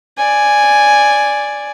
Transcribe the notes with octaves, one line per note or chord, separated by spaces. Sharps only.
D5 G#5